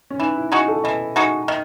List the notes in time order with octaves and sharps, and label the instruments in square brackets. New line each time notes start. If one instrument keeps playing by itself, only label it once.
[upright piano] C#4
[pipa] E3 [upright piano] D#4
[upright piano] E4
[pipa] G#3 D#4 F#4
[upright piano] A4
[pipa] E3 [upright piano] D#5
[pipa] G#3 D#4 F#4
[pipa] D#3 [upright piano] D#5